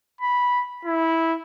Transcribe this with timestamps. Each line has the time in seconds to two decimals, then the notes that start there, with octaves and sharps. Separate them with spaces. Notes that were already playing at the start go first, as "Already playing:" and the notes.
0.21 B5
0.86 E4